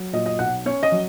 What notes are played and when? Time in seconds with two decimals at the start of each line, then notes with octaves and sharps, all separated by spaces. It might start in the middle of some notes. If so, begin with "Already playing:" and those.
Already playing: F#3
0.13 A#2 D#5
0.26 D#5
0.39 B1 F#5
0.66 C#4 C#5
0.83 D#5
0.92 F#3